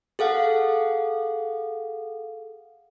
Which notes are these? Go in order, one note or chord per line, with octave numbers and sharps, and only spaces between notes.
G#4 A4 F5 F#5